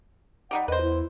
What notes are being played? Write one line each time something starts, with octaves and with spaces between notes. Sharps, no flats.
G3 D#4 G4 F#5
E2 B4 C5 D#5
E4